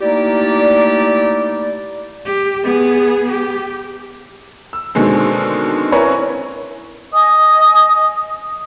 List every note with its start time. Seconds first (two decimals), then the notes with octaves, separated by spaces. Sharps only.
0.01 A3 A#3 D#4 E4 G4 D5
2.25 G4
2.63 B3 G#4
3.29 G4
4.73 E6
4.95 B2 D3 D#3 G#3 C4
5.92 C4 C#4 E4 A#4 B4 C#5
7.12 D#5 G#5 D#6